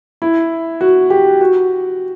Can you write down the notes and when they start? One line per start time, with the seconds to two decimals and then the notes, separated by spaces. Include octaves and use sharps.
0.22 E4
0.81 F#4
1.10 G4
1.41 F#4